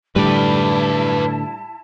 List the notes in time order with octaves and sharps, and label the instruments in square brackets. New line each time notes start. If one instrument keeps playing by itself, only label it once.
[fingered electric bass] A2 D3 [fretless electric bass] G3 [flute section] E4 A5 [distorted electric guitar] B4 D5